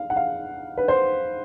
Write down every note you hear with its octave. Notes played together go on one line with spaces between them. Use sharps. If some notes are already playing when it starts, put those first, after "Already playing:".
Already playing: F5
F#5
F5
B4
C5